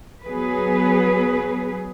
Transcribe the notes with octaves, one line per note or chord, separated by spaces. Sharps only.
F#3 B3 G#4 B4